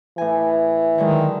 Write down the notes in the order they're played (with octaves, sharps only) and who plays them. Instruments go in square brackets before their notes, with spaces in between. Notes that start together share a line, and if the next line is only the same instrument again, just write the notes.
[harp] A2 G#5 [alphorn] E3
[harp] D3 F#3 G#3 [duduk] D#3